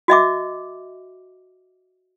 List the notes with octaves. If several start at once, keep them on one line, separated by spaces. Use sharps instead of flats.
F#4 D#5 E5 D6